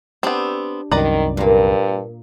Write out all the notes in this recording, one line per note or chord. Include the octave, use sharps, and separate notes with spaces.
B3 C4 D4 G4
C2 F#2 D#3 B4 D5 A#5
G2 A#2 A#3